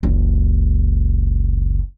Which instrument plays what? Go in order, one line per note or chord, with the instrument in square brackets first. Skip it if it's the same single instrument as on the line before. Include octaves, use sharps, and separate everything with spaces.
[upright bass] F#1 C#2